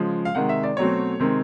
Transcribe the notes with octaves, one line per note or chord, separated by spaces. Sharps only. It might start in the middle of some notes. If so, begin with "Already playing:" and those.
Already playing: C#3 F3 G#3
F5
C3 D#3 G#3 F#5
E5
D5
B2 F#3 A3 C4 C#5
C3 D#3 G#3 C4